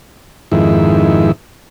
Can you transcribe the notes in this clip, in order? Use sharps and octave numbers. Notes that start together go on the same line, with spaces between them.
F2 G#2 D#3 E4